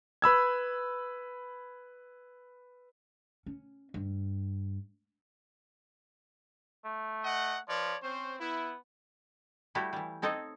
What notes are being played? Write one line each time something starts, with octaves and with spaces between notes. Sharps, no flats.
B4 B5 E6 G#6
C#4
G2
A3
D#5 F#5
F3 B4 C#5 D5
C4 C#4 C5
B3 E4
G3 A3 E4 F#4 G4
E3 G3
C4 D#4 A4 C#5 D#5